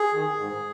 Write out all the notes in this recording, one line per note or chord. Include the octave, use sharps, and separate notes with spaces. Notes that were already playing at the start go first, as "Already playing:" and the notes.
Already playing: G#4
D#3
G#2